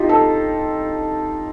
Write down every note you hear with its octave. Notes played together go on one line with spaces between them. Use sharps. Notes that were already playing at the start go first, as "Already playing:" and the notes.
Already playing: D#4 F4 G4
A4